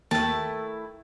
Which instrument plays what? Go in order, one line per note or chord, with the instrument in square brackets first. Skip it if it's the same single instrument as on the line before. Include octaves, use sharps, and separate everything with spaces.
[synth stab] D#2 [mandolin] A3 E4 [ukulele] A#4 G5 [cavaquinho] A5